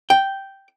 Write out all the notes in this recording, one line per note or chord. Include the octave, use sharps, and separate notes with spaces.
G5